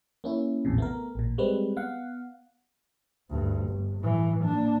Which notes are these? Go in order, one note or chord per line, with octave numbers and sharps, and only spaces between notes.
A#3 C#4 E4
A#1 E2 A2 C3
A3 B3 A#4
A1 A#2
G3 G#3 C4 B4
B3 F5 F#5
D2 G2
G1
A2 E3
A#3 D4